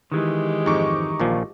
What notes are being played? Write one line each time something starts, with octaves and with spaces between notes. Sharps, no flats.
D#3 E3 G#3 G4
F2 G#2 D#4 C#6 D6
A#1 A#2 F3